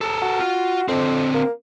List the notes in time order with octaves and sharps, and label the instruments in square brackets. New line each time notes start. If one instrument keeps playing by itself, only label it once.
[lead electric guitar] A4 A#4
[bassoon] F#4
[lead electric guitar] F4
[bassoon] F2 [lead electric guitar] D3 C4
[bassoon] A#3